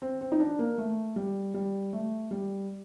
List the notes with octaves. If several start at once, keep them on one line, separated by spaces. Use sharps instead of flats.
C4
C4
D#4
D4
A#3
A3
G3
G3
A3
G3